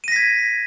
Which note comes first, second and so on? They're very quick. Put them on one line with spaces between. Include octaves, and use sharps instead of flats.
D#7 A#6 B6 G#6